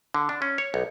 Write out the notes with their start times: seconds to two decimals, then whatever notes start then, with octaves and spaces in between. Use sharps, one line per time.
0.14 D3
0.29 D4
0.42 C#4
0.58 C#5
0.74 B1